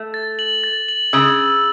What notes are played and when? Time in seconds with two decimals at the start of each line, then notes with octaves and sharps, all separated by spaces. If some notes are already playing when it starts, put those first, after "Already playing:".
Already playing: A3
0.14 A6
0.39 F#7
0.64 A6
0.88 F#7
1.13 C#3 E6